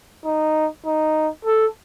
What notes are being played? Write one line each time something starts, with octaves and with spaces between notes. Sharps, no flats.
D#4
D#4
A4